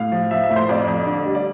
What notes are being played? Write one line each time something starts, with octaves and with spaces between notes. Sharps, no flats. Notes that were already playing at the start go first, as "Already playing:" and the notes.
Already playing: A2 F5
F3
F3 E5
E5
A2
C5
F2 D5
F2
D3
G3
D5